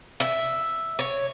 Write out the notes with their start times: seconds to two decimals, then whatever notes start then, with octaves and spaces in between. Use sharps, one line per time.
0.20 E5
0.99 C#5